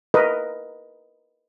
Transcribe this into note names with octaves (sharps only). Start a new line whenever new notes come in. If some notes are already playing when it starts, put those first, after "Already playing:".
A#4 B4 D#5